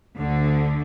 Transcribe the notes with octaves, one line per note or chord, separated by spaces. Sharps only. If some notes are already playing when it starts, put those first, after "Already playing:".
D2 D3